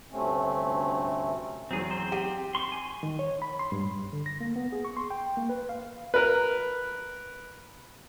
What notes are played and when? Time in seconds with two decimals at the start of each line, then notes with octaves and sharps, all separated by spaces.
0.12 D2 G2 C3 A3 C4 C#4
1.71 E2 F#3 C4 G#4
1.91 C4 C5
2.12 G4 D#7
2.55 C6 C#6
2.72 G#5
3.03 D#3
3.19 C#5
3.42 B5
3.59 C6
3.72 G2
4.13 D3
4.26 A#6
4.41 A#3
4.56 B3
4.72 G#4
4.85 C#6
4.97 C6
5.10 G5
5.37 A#3
5.49 B4
5.69 F5
6.14 A#4 B4